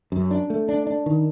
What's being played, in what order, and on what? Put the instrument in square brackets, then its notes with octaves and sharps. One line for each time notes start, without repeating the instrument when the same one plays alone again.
[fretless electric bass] F#2
D4
A3
D4
D4
D#3